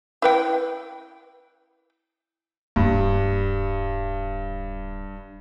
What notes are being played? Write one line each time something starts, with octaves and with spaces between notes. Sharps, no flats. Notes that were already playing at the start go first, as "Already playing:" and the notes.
E4 B4 G5
D1 G2